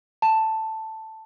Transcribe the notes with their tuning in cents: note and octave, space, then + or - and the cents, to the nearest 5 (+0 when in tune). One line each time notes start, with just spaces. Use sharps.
A5 +5